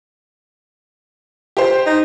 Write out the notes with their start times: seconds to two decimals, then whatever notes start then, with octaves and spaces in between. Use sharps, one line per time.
1.57 G4 C5
1.86 D#4